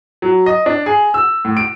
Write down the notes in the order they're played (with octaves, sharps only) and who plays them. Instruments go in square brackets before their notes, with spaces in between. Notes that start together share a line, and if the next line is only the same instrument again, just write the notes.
[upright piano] F#3
D#5
D4
G#4
E6
A2
D7